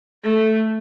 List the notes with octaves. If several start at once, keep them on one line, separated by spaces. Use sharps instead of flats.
A3